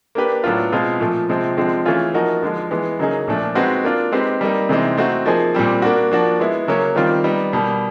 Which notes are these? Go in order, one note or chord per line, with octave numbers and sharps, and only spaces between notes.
A#3 D4 G4 B4
A2 F#3 B3 D4 F4
B2 G#3 C4 F4
A#2 F3 A3
C3 F3 G#3 C4
D3 F3 G#3 C4
E3 A3 C#4 F4 G#4
F3 A#3 D#4 F#4 A#4
D3 F3 G#3
E3 G#3 B3
C#3 F#3 A#3 D#4 G#4
A#2 F3 A3 D4
G#3 C4 D#4 F#4 B4
A#3 D4 F4
G#3 C4 D#4 G4 B4
G3 A#3 D#4
C3 E3 G#3 C4 D#4
A3 C4 D#4 F#4
F3 A#3 D#4 G#4 C5
A#2 G3 C4
A#3 D4 F#4
F3 A#3 D4 F#4
G#3 B3 E4
C#3 F#3 A#3 C#4
D#3 G3 C4 F4
G3 B3 D#4
B2 G3 A#3